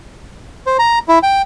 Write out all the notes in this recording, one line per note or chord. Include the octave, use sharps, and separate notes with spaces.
C5
A#5
E4
G5